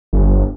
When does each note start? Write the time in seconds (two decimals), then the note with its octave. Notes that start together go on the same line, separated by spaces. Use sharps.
0.13 G1